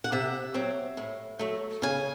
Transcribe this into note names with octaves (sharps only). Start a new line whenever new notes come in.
F#5
C3 E5
F#3 C4
A2
F#3 A3
C#3 G#5